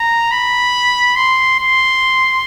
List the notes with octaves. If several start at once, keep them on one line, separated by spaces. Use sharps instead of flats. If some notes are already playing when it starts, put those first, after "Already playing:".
Already playing: A#5
B5
C6
C6